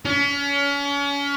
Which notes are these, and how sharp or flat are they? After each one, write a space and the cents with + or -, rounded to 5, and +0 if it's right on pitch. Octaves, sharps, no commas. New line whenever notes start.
C#4 +35